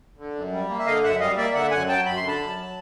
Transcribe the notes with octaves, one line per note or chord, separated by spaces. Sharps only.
D3
F#2
G3
A#3
E5
D3 D#5 F5
F#2 E5 F#5
G3 D#5 F5
A#3 D5 E5
D3 E5 F#5
F#2 F#5 G#5
F#3 G5 A5
F#2 B5
C6
D3 A5 B5
F#2
F#3